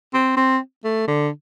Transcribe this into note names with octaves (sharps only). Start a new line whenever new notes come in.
C4
C4
A3
D3